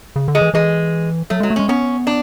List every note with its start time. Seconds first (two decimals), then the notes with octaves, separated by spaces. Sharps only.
0.16 C#3
0.28 D3
0.35 G#3
0.41 E3
0.54 E3 G#3
1.30 F#3 A3
1.40 F#3 G#3
1.50 A3
1.56 G#3 C#4
1.69 B3 C#4
2.07 D4